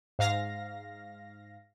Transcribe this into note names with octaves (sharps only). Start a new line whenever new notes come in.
G#2 F5 A#6